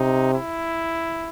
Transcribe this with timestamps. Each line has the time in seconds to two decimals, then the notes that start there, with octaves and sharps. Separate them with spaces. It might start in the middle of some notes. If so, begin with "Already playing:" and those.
Already playing: C3 D#4
0.34 E4